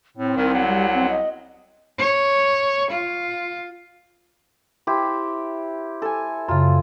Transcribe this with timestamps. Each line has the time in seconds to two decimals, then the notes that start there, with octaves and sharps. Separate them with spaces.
0.17 A2 C4
0.36 C2 D#3
0.54 F#3
0.68 G3
0.94 C4
1.10 D#5
1.98 C#5
2.91 F4
4.87 E4 G4 C5
6.02 A4 G#5
6.49 F#2 C#3 F4